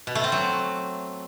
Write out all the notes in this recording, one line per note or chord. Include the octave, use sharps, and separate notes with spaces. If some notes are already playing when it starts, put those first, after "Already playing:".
B2
A3
C4
F#3